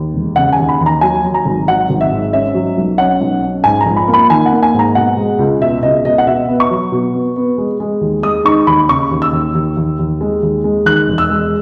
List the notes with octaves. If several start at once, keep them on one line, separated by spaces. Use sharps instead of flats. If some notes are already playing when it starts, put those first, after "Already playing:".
Already playing: D#2
E1
C#3 F#5
G#5
D#2
B5
D#2
A#5
F#3 G#5
F#3
A#5
G#1
F#3 F#5
G#1
E5
G#2
C#4 E5
F#3
B1
C#4 F#5
B1
C#4
G#2 G#5
A#5
A#1
B5
A#3
B5
D#3 G#5
F#5
A#3
G#5
G#2
A#5
B2 F#5
G#3
C#2
B2 E5
C#2 D#5
B2 D#5
F#5
B2 E5
B3
C#6
F#3
B2
B3
B3
G#3
G#3
D#2
G#3 D#6
D#4 C#6
D#2 B5
C#3 C#6
D#2
E6
D#2
D#2
D#2
D#2
G#3
D#2
G#3
D#3 F#6
E1
E6
G#3